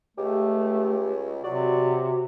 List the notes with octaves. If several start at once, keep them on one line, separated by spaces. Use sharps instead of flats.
C#2 A3 G4
C3 F#3 F#4 D5